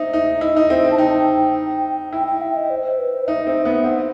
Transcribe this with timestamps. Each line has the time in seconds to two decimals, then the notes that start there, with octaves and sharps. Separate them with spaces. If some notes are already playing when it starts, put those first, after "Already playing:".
Already playing: C4 D#4 E5
0.13 D#4
0.41 E4 D#5
0.57 D#4
0.70 C4 E5
0.85 C4
0.91 A5
0.98 D#4 G5
2.13 E4 G5
2.27 G5
2.42 E5
2.56 D#5
2.70 C5
2.85 C5
2.99 B4
3.14 C5
3.27 D#4 E5
3.46 C4 E5
3.65 B3 E5
3.84 C4 F#5